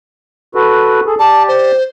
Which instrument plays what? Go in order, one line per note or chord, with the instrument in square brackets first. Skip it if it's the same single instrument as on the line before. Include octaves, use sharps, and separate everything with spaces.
[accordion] F#4 A4 B4
G#4 A4
[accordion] G4 D5 [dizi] A5
[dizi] C5